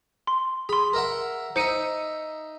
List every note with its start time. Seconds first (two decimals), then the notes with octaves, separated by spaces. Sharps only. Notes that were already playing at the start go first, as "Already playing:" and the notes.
0.27 C6
0.69 G#4 B5 C6
0.93 A#4 E5 F#5
1.56 D#4 C5 E5 C#7 D#7